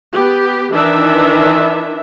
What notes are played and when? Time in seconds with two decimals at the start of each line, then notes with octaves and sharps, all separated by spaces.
0.14 B3 G4
0.73 D#3 E3 D4 E5